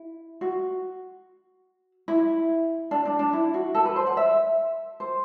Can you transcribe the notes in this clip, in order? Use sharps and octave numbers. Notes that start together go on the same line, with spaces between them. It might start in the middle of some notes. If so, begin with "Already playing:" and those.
Already playing: E4
F#4
E4
D4
D4
D4
E4
F#4
A4
B4
C5
F#5
E5
C5